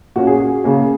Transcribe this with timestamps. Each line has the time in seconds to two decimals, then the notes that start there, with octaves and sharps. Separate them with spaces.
0.16 A#2 A#3 C#4 F#4
0.27 G#4
0.37 F#4
0.64 C#3 A#3 C#4 G#4